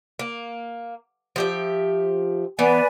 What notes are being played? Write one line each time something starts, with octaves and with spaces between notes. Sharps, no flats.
A#3
F3 G4 E5
E3 B3 B4 D5 G#5